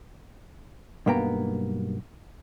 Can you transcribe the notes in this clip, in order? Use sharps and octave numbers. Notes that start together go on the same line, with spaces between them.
B1 G2 A#3 B3 G5 A#5